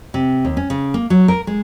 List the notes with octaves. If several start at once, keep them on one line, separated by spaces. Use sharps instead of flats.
C3
D#2
C#4
C#3
A#3
F#3
A#4
G#3